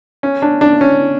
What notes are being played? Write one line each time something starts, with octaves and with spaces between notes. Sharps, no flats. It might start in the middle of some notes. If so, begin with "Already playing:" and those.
C#4
D4
D4
C#4